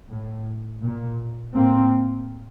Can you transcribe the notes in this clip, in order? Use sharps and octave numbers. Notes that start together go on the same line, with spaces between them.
A2
A#2
A2 A#3 C4